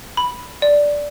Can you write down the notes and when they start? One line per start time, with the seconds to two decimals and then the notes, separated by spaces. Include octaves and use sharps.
0.17 B5
0.62 D5